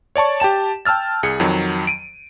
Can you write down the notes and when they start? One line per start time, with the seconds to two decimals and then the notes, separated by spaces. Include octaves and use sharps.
0.16 C#5 D5 A5 C#6
0.40 G4 G5 A5 E7
0.85 G5 A5 E6 F6 A6
1.23 C2 G#4 C#7
1.40 F2 D#3 F#3
1.87 D7 D#7